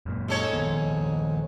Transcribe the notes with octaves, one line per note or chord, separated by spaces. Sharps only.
F#2 A#2
G#2 A4 C#5
A#1 D#3 B3